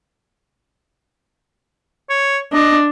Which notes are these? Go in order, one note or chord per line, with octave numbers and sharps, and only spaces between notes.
C#5
D4 D#5